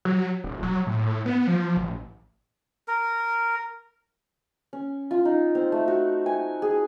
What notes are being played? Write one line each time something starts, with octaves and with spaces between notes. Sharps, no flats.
F#3
D#1
F#3
A2
B3
F3
A1
A#4
C#4
F4
D#4
C4
A3
F#4
G#5
G#4